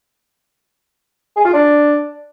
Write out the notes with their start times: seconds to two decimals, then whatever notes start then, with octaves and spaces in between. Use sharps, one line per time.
1.36 G#4
1.45 F4
1.54 D4